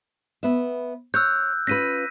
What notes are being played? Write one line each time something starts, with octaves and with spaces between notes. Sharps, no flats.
B3 B4 E5
C#5 E6 F#6 G6
C#4 F4 B4 A#6 B6 D#7